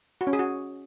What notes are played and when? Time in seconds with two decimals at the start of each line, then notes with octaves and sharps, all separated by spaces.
0.21 F#4
0.27 C#4
0.33 G#4
0.39 F#4